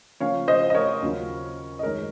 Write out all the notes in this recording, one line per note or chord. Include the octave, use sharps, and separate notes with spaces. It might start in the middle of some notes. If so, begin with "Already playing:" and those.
C#3 F3 A#3 C#4 F4 C#5 F5
C5 D#5
D#5
A#4 C#5
D#2 C#3 F#3 C#4 F4
D#5
F#2 D#3 G#3 D#4 A#4 C#5